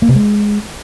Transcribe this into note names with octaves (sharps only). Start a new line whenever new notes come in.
A#3
C3
G#3